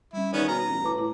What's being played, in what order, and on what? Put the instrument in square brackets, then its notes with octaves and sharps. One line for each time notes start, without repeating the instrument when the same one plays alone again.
[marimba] G3 C#4 [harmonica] E4
[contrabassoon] D#3 [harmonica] B3 C#4 G#4 [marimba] D5
[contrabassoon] B2 [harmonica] A#5 [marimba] F6
[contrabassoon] A1
[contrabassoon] A2 [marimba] B4 A5 D6
[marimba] E4